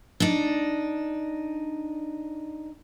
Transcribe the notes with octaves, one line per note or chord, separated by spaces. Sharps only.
D4 D#4